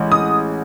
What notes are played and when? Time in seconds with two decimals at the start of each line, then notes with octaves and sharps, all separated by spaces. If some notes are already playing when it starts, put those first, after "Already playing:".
Already playing: A1 G#3
0.12 D#6